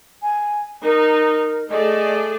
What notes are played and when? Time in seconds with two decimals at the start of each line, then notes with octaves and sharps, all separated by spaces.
0.22 G#5
0.84 D#4 A#4
1.70 A3 G#4 D5 D#5